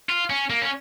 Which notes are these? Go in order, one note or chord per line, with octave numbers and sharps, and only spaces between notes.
F4
C#4
A#3
C#4